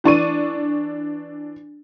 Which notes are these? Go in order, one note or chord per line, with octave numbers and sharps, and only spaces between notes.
E3 D4 C#6 D#7